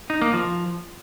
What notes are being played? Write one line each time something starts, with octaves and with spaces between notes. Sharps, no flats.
D#4
A#3
F3